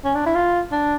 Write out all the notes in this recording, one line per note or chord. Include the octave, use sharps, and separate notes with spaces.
C#4
D4
E4
F4
D4